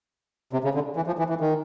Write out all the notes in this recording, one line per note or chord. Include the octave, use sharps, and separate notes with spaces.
C3
C#3
D3
E3
F3
E3
E3
D#3